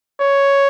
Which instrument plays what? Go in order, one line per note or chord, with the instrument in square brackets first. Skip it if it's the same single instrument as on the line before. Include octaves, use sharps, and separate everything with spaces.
[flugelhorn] C#5